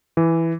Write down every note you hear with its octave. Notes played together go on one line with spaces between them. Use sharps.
E3